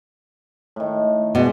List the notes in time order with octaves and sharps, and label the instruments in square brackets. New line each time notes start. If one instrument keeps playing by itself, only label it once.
[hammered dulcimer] A2 D#3
[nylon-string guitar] B2 B3 [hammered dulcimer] G#3 D5